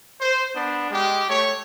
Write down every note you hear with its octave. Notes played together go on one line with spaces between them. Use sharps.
C5
B3 D4
G#3 G4
A3 C#5